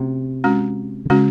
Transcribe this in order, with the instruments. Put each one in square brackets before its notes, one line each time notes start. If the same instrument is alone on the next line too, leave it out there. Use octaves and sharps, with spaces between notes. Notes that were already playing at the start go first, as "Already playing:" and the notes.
Already playing: [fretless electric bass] C3 [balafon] A3 C#4 F#4
[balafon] G#3 C#4 F#4
[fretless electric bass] D3
[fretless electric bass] C#3 [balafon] G#3 C#4 F#4